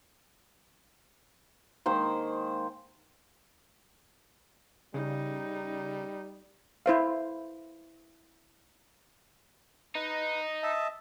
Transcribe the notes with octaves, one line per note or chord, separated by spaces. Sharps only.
D#3 G#3 A#3 C5
C#3 G3 D#4
E4 C5 F5
D#4 B4
D#5 E5 A5